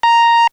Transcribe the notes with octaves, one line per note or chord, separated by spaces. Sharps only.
A#5